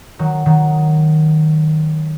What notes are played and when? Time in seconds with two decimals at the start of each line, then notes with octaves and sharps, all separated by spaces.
0.19 D#3 F#3
0.46 D#3 F#3